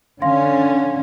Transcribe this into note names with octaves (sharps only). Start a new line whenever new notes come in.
D3 C#4 F5 C6